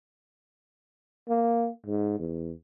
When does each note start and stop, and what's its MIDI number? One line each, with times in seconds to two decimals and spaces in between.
1.29 1.69 58
1.86 2.18 44
2.19 2.52 40